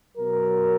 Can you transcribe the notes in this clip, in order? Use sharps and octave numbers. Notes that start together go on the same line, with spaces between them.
B2 F#3 A#4